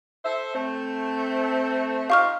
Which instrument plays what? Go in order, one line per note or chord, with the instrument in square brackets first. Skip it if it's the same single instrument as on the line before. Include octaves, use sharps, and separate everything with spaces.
[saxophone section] A4 C5 E5
A3 C4
[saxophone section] D#4 F4 G4 [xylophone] F5 C#6 F6